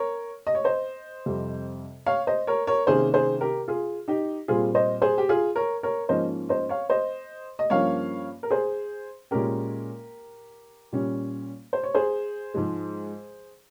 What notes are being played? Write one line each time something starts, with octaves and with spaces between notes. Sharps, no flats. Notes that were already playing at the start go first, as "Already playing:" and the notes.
Already playing: A#4 C#5
D#5
C#5
C5 D#5
F2 C3 G3
C#5 F5
C5 D#5
A#4 C#5
A#4 C#5
C3 D#3 A#3 C#4 G#4 C5
G#4 C5
G4 A#4
F4 G#4
D#4 G4
A#2 G3 C4 F4 G#4
C5 D#5
G#4 C5
G4
F4 G#4
A#4 C#5
A#4 C#5
G#2 F3 A#3 C#4 C5 D#5
C5 D#5
C#5 F5
C5 D#5
D#5
G2 F3 A#3 C#4 C#5 F5
A#4
G#4 C5
A#2 G#3 C#4 G4 A#4
A#2 G3 C#4
C5
C#5
G#4 C5
G#2 F3 G#3